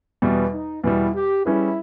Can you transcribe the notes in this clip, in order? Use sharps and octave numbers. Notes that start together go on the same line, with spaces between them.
E2 B2 G3
D#4
E2 B2 G3 E4
G4
G3 C#4 E4 G#4 B4